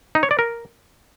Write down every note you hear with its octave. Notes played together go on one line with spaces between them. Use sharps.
D#4
C#5
D5
A#4